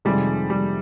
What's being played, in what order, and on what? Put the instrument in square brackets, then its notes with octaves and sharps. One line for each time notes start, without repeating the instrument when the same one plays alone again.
[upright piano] F2 C3 D#3 G#3 [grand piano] G3
[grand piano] G3